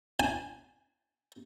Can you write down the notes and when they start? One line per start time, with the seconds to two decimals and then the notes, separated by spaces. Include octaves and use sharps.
0.20 G#5